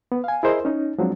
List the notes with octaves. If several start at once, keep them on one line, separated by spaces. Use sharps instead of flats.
B3
F5 G#5
E4 G#4 A#4 C5 D#5
C#4 D#4
F3 F#3 G#3 C4 D4